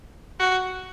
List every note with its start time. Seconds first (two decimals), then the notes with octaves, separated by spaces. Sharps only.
0.40 F#4